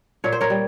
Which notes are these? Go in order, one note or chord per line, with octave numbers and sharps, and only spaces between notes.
A#2 C#5
C5
A#4 C#5
G3